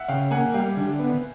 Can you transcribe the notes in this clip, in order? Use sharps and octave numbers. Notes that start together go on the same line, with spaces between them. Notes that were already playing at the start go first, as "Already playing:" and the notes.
Already playing: E5 F#5
C#3 F5 G5
A#3 F#5 G#5
G3 F5 G5
D3
B3